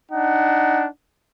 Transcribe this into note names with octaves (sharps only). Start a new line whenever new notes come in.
D4 D#4 F#5